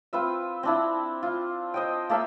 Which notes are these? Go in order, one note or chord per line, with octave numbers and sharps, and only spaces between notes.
C4 F4 B4 E5
C4 D4 E4
F4
C5 D#5 G5
A#3 A4 E5 F5